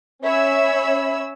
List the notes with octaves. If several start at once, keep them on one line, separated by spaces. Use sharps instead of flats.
C#4 C#5 E5 B5 E6